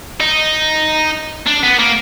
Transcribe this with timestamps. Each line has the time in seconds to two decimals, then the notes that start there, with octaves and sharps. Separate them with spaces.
0.20 D#4
1.47 D4
1.64 B3
1.79 A#3